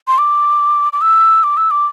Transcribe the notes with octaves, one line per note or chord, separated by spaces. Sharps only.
C6
D6
D6
E6
D6
E6
D6